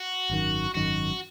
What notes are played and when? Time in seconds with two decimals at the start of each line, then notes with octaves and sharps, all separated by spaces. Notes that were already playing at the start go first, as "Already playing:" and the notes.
Already playing: F#4
0.30 G#1 F#2 D#3
0.74 G#1 F#2 D#3 F#4